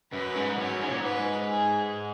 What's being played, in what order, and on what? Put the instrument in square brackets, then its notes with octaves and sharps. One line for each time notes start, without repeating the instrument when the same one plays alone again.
[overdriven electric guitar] F#2 [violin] B4
[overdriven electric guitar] G#2
[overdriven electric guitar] F#2 [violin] C#5
[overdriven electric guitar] G#2
A#2
[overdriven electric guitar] G#2 [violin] B4
[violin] G#4